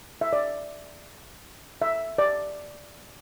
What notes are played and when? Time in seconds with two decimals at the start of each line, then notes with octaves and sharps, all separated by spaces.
0.21 E5
0.33 D5
1.82 E5
2.18 D5